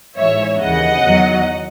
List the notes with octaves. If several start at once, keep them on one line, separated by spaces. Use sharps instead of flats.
A1 G#2 E3 C#5 E5
D#2 C#3 E3 D#5 F#5
E2 D#3 F#3